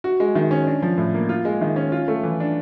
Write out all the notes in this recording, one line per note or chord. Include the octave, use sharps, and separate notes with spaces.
F#4
G#3
D#3
C#4
D4
F3
A2
A#3
F4
G#3
D#3
C#4
F4
A3
E3
D4